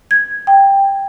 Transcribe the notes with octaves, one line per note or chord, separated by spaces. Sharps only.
G#6
G5